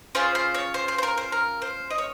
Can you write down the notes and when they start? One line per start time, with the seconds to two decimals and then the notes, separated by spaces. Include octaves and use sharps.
0.15 C#4 F4 G#4 C5
0.35 C5
0.54 C#5
0.74 C5
0.88 C5
0.98 C5
1.03 A#4
1.17 C5
1.32 A#4
1.62 C5
1.90 D#5
1.98 C#5